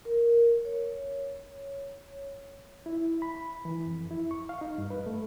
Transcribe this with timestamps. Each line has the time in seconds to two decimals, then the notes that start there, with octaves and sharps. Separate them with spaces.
0.05 A#4
0.65 C#5
2.86 E4
3.22 B5
3.65 E3
3.86 F2
4.11 E4
4.31 C#6
4.49 F5
4.61 D#4
4.78 G2
4.90 B4
5.06 A3